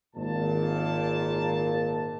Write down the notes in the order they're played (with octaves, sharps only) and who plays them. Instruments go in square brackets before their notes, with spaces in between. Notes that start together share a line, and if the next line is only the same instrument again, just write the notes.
[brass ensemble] G#1 A#2 A#3 A5